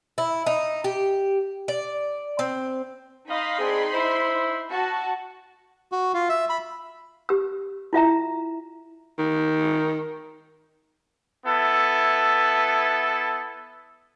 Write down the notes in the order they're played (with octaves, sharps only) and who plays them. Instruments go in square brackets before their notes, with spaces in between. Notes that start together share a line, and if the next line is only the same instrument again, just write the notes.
[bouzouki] E4
D#4
G4
D5
C4
[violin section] D#4 B5 C6 [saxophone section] D#5 F5
[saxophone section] C4 D4 G#4
E4 C5
[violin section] F#4 A5
[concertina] F#4
F4
E5
B5
[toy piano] G4 E6
E4 F4 E5 A#5
[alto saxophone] D#3
[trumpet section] B3 E4 A4